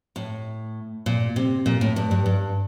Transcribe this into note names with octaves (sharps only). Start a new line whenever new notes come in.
A2
A#2
C3
A#2
A2
G2
G2
G2